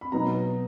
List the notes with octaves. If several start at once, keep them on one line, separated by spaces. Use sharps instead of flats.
B5
B2 F#3 B3 D#4 A#5